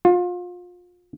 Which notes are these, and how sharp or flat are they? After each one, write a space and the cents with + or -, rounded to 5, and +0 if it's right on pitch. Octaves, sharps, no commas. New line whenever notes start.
F4 +30